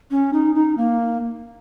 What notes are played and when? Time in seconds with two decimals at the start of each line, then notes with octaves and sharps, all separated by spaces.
0.11 C#4
0.33 D#4
0.55 D#4
0.77 A#3